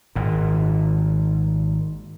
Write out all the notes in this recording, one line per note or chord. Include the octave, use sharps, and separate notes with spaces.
G#1 A#2